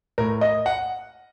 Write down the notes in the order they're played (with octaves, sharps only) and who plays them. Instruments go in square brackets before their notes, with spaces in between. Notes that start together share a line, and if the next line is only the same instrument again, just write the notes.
[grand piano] A2 A#4
D#5
F#5